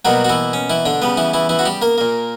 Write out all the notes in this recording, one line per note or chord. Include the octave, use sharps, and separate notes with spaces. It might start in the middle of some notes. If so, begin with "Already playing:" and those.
B2 F#3 G3 A#3 F#4
F#4
E3 E4
C#4
E3 E4
D3 D4
C#3 G3 B3
E3 E4
E3 E4
E3 E4
F#4
G3 G4
A#3 A#4
A#2 A#3